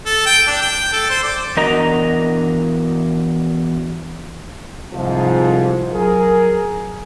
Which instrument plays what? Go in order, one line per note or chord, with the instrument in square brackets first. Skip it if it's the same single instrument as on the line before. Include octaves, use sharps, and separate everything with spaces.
[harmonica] A4
G5
D4
G5
A4
C5
D5
[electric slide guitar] E2 D4 F#4 A#4 D#5 A#5
[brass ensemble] C2 G#2 F3
F#3 G#4 A#4